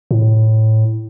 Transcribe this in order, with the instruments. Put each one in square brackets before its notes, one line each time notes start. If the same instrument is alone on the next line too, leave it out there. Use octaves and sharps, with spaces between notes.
[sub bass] A2